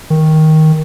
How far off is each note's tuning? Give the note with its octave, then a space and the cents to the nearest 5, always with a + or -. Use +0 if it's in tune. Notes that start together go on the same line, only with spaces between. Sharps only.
D#3 +10